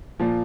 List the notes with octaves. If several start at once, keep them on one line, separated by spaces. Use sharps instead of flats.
A#2 F3